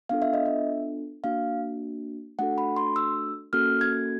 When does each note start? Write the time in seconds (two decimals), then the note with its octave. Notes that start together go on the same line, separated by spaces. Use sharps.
0.09 B3 D4 F4 A4 F5
0.22 E5
0.33 D#5
0.46 E5
1.24 A#3 D4 F#4 F5
2.39 A3 D4 F#4 A4 F#5
2.58 B5
2.76 C6
2.96 E6
3.53 A#3 C#4 F#4 A4 F6
3.81 G#6